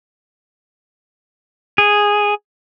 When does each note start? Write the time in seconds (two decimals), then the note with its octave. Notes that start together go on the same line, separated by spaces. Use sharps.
1.78 G#4